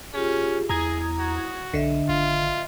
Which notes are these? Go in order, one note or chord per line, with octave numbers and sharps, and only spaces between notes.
C#4 F4 G4 G#4
E2 E4 G#4 A#5 D#6 G#6
F#4
B1 D3 D#5 E5
G#1 F4